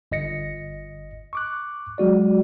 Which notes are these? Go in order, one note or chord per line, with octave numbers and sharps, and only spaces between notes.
G1 D#5 A#6 C#7
C#6 D6 F#6
F#3 G#3 F#4 D5